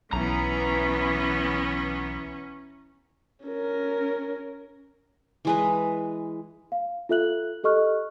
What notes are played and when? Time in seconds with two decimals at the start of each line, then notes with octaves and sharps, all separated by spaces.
0.13 B1 E3 B3 C#4 A#5
3.46 C#4 A#4
5.45 E3 G#3 B4
6.72 F5
7.09 F4 A4 E5 F#6 F#7
7.64 G4 A4 D#5 C#6 F6 F#6